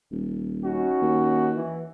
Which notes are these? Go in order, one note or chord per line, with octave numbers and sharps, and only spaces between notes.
D#1
C#4 D#4 F#4
D#2
E3